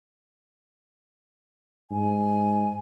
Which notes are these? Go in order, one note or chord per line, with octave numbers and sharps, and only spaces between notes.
G#2 G#5